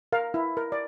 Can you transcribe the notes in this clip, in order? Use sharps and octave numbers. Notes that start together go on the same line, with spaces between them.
A#4 F5
E4
A#4
D5